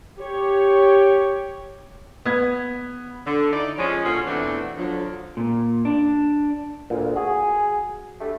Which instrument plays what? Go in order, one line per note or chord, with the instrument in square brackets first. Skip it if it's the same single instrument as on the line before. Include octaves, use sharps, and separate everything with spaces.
[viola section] G4 C#5
[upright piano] B3 G#6
[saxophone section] D3
D#4 E4 D5
F3 G#3 C#4
A#2 D3 C#4 F4 F#4
E2 B2 A3 C4 D4 F#4
D3 F3 F#3
[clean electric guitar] A#2
D4
[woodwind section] D2 [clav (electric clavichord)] A#2
[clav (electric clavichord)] F#4 [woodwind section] G#4
[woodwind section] D3 G3 A3